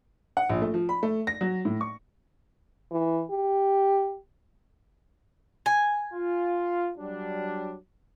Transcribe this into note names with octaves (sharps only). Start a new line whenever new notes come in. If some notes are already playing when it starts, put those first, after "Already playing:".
F#5
A#1
A3
F3
B5
A3
A#6
F#3
A2
C#6
E3
G4
G#5
F4
F#3 G3 D4